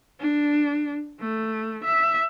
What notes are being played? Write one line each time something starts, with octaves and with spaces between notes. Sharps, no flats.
D4
A3
E5